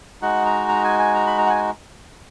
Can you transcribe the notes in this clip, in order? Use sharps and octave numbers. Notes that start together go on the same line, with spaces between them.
G#3 D#4 F#4 F#5
A#5
A#5
G#5
G#5
A#5
B5
A#5
F#5
G#5